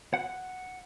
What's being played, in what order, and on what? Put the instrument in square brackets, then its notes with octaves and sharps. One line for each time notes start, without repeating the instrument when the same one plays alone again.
[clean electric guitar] F#5